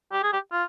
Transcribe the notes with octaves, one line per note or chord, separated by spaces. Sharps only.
G4
G#4
G4
F4